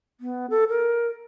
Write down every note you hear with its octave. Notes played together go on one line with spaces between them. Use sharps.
B3
A4
A#4